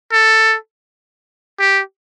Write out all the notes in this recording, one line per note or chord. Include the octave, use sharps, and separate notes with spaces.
A4
G4